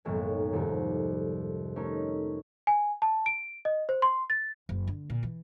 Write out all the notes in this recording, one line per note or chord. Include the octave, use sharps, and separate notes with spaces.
B1 F#2 A2 D#3 G#3 A#3
C2 F2 G#2 C3 D#3 G3
A3 C#4 D#4 A#4
G#5
A5
D7
D#5
C5
C6
A6
F#1
D3
A#2
E3